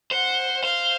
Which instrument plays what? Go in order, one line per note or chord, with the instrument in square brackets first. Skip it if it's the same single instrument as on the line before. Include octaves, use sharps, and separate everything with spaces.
[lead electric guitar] C5 [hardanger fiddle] F#5
[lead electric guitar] C5 [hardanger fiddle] F5